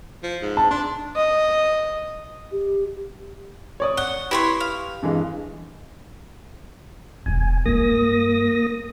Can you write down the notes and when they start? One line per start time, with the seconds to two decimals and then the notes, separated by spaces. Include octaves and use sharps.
0.23 F3
0.42 G#2
0.57 A5
0.71 D4 C6
1.16 D#5
2.52 G4
3.80 C#5 D5 D#6
3.97 F#5 G7
4.31 E4 G4 B4 C#5 C6
4.60 F5
5.02 G2 E3 G#3
7.26 E1 G#3 G#5
7.66 G2 G#3 A#3 D#6 A#6